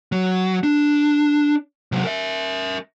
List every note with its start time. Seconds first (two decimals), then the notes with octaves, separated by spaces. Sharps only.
0.12 F#3
0.63 D4
1.92 C3 F#3
2.04 A#4 E5